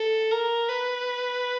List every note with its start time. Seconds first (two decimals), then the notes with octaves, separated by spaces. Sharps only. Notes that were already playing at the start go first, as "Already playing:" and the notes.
Already playing: A4
0.31 A#4
0.69 B4